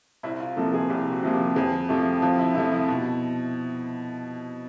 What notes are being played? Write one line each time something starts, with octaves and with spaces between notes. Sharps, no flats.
C2 E4
F4
C3 F3 A#3 A4
G#4
C2 G4
F#4
C3 F3 A#3
G4
F2 G#4
C3 F3 A3 G4
F2 F4
E4
C3 F3 A3 E4
E4
B2